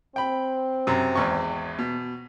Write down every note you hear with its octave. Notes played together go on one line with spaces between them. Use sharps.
C4 G5 B5
F#2 C3
G#1 E2 C#6
B2